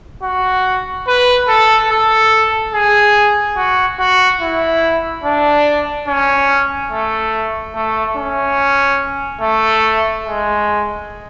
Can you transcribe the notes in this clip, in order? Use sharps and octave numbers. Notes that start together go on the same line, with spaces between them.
F#4
B4
A4
A4
G#4
F#4
F#4
E4
D4
C#4
A3
A3
C#4
A3
G#3